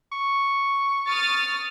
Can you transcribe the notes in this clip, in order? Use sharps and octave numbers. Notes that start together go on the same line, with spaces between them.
C#6
D#6 F6 A6